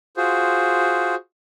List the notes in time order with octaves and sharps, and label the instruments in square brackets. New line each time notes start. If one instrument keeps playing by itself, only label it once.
[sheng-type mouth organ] F4 F#4 G#4 C5